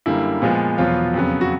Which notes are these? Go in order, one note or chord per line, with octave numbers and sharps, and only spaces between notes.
F#2 D3 G3 A#3 E4
A#2 F3 G#3 B3
E2 B2 F3 F#3 B3 F4
F2 C#3 F#3 B3
F#4